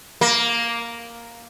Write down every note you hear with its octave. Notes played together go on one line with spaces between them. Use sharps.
A#3